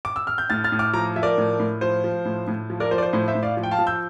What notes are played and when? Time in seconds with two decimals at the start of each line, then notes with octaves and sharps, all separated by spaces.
0.05 D6
0.16 E6
0.27 F6
0.38 G6
0.50 A2 F6 A6
0.64 F6 A6
0.72 A2
0.79 D6 F6
0.93 F3 A#5 D6
1.16 F3 E5
1.23 A#4 D5
1.38 A2
1.59 A2
1.81 F3 C5
2.04 F3
2.25 A2
2.47 A2
2.70 F3
2.80 A#4 D5
2.91 F3 C5
2.98 D5
3.03 C5
3.13 A2 C5
3.28 C5 E5
3.35 A2
3.43 D5 F5
3.57 F3
3.63 G5
3.71 F5 A5
3.79 F3
3.87 E6 G6